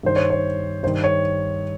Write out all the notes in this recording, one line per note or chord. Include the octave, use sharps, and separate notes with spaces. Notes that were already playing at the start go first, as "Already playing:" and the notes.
G2 D#3 C5
C#5
C#5
G2 D#3 C5
C#5